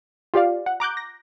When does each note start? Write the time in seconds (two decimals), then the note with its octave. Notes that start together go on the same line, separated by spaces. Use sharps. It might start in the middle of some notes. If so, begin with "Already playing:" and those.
0.34 F4 G4 D5 F5
0.66 F#5
0.80 A#5 D6 F#6 G6
0.97 A#6